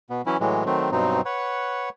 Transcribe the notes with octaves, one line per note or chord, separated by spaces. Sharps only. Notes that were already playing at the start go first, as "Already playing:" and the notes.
B2 B3
E3 F#3 C#4 E4
A2 E3 F#3 G#3
D#3 F#3 A3 C4
G2 B2 F#3 C4 D#4
B4 C#5 F#5